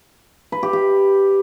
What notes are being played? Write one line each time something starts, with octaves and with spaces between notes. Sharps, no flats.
B4
G4
G4